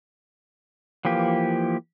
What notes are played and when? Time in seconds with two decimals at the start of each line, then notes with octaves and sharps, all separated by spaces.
1.05 E3 F3 A#3 G4